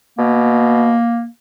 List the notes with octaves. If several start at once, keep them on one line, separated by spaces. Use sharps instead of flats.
B2 A#3